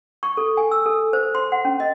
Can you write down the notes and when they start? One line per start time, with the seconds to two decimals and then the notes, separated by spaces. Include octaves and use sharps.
0.23 C#6
0.37 A4
0.57 G#5
0.71 E6
0.86 A4
1.13 C5
1.35 C6
1.52 F#5
1.65 C#4
1.80 D#5